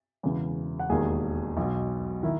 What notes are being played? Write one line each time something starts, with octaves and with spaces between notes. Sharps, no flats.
E1 E2 C#3 E3
F#5
E1 D#2 D#3 G#4 G#5
B1 B2
D#3 E4 E5